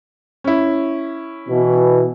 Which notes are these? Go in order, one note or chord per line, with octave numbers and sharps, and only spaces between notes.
C#4 E4
B2 E3